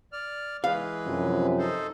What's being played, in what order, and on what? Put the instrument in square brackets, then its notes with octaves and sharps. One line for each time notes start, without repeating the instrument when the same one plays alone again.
[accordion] D5 F6
[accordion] E3 G#3 B4 [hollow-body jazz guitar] F5
[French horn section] F#2 C3 F3
[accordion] D#4 A4 C5